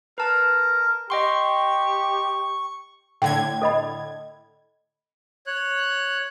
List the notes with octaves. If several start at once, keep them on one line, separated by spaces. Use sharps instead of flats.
A#4 B4 A5
G4 D#5 G5 C6 C#6
A2 D3 G5 G#6
A4 D#5 B5
C#5 F#6